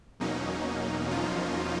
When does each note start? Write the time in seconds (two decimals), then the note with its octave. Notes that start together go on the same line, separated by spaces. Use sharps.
0.20 E2 B2 F#3 A#3 C#4 D#4
1.11 F3 F4